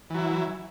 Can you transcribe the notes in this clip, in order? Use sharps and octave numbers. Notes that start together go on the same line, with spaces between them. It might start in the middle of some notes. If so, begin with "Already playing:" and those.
E3 F#3 E4